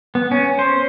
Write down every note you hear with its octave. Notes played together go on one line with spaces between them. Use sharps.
B3
C#4
C5